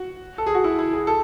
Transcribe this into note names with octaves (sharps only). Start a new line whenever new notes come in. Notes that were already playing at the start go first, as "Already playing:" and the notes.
Already playing: F#4
A4
G#4
F#4
E4
E4
G#4
A4